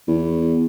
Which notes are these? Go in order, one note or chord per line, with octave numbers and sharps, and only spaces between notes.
E2